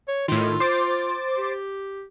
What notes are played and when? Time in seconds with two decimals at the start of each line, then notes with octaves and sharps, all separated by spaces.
0.08 C#5
0.28 A2 D#3 F4
0.60 C5 D6 A6
1.38 G4